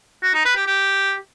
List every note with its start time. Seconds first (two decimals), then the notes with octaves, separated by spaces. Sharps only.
0.23 F#4
0.34 D#4
0.45 B4
0.56 G4
0.67 G4